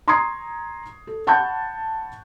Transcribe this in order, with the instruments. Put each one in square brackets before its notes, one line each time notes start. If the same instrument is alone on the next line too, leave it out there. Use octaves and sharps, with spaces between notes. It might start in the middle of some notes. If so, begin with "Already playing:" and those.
[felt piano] A#5 C6 C#6 D#6 G#6 C7
A4
F#5 A5 B5 C#6 F#6 G6